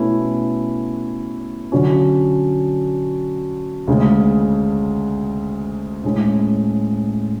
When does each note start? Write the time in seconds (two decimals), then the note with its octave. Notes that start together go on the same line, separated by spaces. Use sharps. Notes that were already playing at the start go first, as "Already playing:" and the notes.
Already playing: B2 A3 C#4 E4 B4
1.72 D3 F#3 C#4
3.87 D2 C#3 G#3
6.04 A2 G#3 C#4